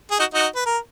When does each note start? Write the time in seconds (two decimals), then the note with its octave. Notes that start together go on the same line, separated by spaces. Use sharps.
0.11 G#4
0.19 D#4 F#4
0.34 D#4 F#4
0.55 B4
0.66 A#4